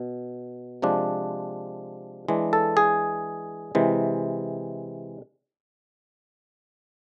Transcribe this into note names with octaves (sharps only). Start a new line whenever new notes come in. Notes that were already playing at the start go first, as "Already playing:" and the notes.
Already playing: B2
C3 F3 G#3 D4
E3 G#3 D4
A4
G#4
C3 E3 G#3